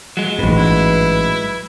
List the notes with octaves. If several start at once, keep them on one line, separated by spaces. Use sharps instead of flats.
F#3 G#3
A1 G#2 B4
E4